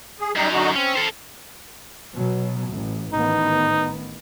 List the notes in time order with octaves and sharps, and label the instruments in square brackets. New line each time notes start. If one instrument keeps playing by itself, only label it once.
[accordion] G#4
[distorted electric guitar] F#2 [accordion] G3 D#4
[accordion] D3 D#4 F#4
[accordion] C4 [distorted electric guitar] C#4
[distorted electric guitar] A4 C5
[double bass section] B2 F#3
A1
[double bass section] A1 D#3 B3 [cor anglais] D#4